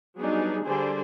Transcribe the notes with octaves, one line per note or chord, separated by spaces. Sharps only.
F#3 G3 B3 D4 D#4 G#4
D3 G3 G#4 C5 D5 G#5